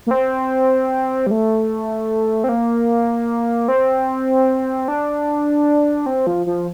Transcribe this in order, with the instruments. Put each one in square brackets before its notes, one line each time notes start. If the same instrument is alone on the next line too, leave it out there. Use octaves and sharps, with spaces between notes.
[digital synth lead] A#3
C4
G3
A3
C4
A#3
C4
D4
C4
F3
F3